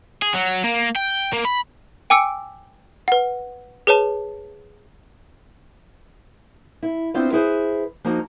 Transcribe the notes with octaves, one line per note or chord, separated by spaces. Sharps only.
G#4
F#3
A#3
G5
A#3
B5
G5 G#5 D6 E6 C#7 D7
B4 F#5
G#4 B4 C#5 A5
E4
B3 C4 D4 E4 F4 C5
E4 G#4 B4 C5
F3 A#3 D#4 F#4